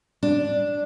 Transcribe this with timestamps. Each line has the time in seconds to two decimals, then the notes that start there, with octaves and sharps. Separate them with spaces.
0.23 D4